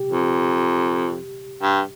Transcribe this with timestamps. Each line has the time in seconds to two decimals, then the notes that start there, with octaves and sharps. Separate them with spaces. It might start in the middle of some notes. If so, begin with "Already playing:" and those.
Already playing: G4
0.12 F2
1.63 G2